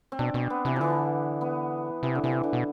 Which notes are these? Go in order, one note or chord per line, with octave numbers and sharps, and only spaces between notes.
C4
B2 D4
B2 C4
B3
C3 E3
D3 E3 F3
B3
C3 E3
D3
C3 E3
D3
B2